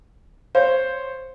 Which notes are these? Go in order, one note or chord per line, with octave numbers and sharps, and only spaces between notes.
C5 C#5 F5